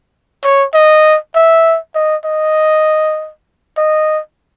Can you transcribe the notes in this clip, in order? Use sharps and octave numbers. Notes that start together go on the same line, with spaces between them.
C#5
D#5
E5
D#5
D#5
D#5